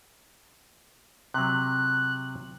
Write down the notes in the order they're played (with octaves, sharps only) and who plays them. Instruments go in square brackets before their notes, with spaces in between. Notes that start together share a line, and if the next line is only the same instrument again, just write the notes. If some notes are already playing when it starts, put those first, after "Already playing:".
[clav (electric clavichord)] C3 F#3 [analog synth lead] F#6